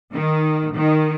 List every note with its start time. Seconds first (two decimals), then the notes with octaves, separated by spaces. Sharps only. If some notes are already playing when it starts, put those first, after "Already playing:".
0.15 D#3
0.76 D#3